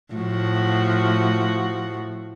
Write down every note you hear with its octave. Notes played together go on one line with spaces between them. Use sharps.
A2 F3 F#4